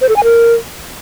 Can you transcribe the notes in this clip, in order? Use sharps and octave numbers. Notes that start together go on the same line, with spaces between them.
C5
A4
G#5
A#4